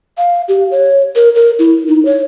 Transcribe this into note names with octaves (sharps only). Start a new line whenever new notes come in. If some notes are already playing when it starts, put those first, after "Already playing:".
F5
G4
C#5
A#4
A#4
E4
D#4
C#5